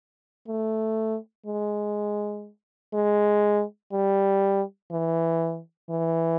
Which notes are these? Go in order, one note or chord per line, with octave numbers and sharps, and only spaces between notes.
A3
G#3
G#3
G3
E3
E3